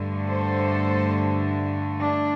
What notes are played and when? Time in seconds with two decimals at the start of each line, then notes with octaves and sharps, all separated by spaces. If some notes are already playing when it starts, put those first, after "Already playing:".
Already playing: G2 D3 A3
0.27 A4 C5
2.00 D4